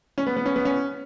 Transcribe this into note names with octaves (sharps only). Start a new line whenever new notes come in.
C#4
B3
B3
C#4
B3
C#4